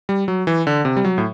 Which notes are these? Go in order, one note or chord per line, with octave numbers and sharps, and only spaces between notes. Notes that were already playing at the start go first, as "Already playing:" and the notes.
G3
F#3
E3
D3
C3
G3
F#3
A2